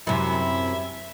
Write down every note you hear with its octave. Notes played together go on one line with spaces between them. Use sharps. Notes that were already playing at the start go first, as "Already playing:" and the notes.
F#2 C3 E4